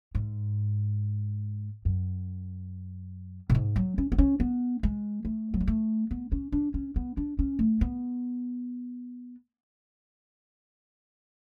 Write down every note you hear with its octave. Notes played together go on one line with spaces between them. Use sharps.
G#2
F#2
A2
G#2
F#3
C#4
B3
C#4
B3
G#3
A3
F#3
G#3
A3
B3
C#4
D4
C#4
B3
D4
C#4
A3
B3